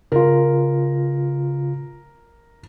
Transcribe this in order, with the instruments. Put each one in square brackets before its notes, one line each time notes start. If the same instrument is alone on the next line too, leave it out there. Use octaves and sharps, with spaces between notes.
[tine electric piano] C#3 F4 [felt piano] A#4